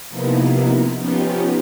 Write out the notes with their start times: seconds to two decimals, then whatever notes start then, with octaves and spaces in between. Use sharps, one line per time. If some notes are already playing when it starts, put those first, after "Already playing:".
0.10 C3 F3 A#3 B3 D#4 E4
0.96 F3 B3 C#4 D#4 F4 G4